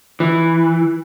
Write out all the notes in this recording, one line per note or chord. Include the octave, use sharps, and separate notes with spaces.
E3